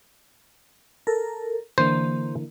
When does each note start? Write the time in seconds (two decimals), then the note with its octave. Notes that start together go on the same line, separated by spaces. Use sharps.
1.07 A4 A#4
1.78 D3 E3 A#3 C5